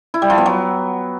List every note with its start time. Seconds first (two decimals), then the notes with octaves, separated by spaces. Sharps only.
0.14 E4
0.22 G3
0.30 F3
0.38 B3
0.46 F#3